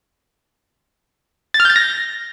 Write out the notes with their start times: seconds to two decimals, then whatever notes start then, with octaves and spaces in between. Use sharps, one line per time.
1.54 A6
1.60 F6
1.65 G6
1.70 A6
1.76 A#6